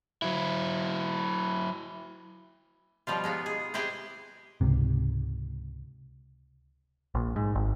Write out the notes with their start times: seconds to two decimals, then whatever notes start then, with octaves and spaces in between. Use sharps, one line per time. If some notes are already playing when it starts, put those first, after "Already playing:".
0.22 F#3 E4
3.07 B2 F3 G3 F4
3.24 G#3 B3 D#4 F4
3.46 G#4
3.74 C4 E4 G4 G#4 B4 C5
4.61 C#2 G#2 C3
7.15 A#1
7.36 G#2
7.55 G#1